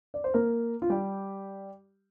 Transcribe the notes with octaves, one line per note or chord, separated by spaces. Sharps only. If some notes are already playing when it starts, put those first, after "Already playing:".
D5
C5
A#3 A#4
F4
G3 G4